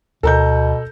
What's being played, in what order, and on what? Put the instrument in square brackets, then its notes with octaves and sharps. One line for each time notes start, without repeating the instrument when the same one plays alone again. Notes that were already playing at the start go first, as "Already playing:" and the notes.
[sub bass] D2 [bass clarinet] B2 [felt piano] A4 A#5 G6